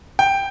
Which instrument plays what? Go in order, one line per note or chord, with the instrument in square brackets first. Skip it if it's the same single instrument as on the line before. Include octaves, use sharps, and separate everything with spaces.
[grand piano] G5